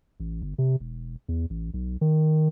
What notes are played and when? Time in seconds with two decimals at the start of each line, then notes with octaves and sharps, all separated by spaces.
0.20 A1
0.42 G1
0.58 C3
0.80 E1
1.29 E2
1.50 A1
1.74 B1
2.01 D#3